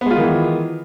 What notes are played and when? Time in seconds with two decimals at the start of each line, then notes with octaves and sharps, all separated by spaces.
0.01 B3
0.06 G#3
0.11 F4
0.15 D#3
0.20 E3